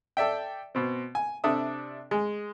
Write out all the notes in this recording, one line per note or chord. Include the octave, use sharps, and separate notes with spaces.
A4 D5 E5 G5
B2 C4
G#5
C3 D4 A4 D5 E5 D#6
G#3